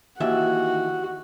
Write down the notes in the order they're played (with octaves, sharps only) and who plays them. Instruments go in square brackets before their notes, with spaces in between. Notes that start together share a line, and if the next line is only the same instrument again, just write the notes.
[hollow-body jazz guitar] D#2 E3 E5 [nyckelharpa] F#4